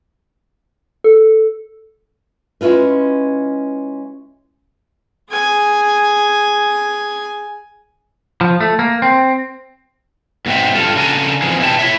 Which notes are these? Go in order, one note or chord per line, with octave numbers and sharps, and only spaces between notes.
A4
G#3 C#4 E4 F4 B4
G#4 G#5
F3
A3
A#3
C4
G#2 B2 C4 E5
G2 F4 A4
C#3 D4 A4 A#4 D5 G#5
E3 F3 C4 D#4 G#4 C5
B2 E4 G4 A5
E4 C#5 E5